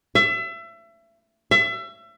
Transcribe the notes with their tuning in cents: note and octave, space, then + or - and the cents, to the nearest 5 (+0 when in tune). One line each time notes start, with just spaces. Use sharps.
E5 +30
E5 +30